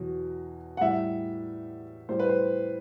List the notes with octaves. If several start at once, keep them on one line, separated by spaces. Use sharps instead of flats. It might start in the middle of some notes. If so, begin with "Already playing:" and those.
Already playing: E2 B2 F#3
F#5
A2 G3 E5
A2 G3 C5
B4
C5